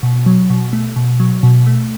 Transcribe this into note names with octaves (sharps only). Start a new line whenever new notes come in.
B2
F#3
B2
A3
B2
F#3
B2
A3